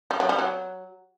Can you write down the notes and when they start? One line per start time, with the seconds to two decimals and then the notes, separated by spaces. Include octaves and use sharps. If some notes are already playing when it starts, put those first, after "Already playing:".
0.11 G3
0.20 F#3
0.29 G3
0.39 F#3